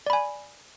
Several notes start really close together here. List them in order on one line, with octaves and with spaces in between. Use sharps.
D5 B5 G#5